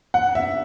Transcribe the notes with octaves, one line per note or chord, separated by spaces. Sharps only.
F#5
E5